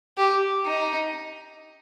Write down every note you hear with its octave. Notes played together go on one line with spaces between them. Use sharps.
G4
D#4